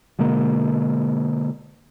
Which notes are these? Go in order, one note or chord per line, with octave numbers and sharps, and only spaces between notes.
B2 D3 G#3 A#3